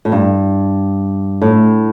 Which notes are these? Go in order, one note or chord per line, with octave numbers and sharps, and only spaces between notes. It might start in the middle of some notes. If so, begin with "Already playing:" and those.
A2
G2
A2